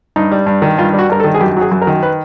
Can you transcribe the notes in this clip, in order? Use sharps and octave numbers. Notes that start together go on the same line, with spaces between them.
G2 D#4
G3
G2
D#3
G2 F4
G3
F#4
G2 A#4
A4
D#3
G#4
F#2 G4
F#3 G#4
F#2
A#4
D#3
B4